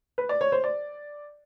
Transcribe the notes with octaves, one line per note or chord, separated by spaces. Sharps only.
B4
D5
C#5
C5
D5